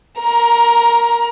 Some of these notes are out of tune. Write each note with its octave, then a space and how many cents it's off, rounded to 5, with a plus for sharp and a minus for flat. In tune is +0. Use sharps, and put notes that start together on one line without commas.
A#4 +0 A#5 +20